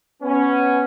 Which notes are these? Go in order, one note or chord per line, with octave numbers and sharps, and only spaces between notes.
B3 C#4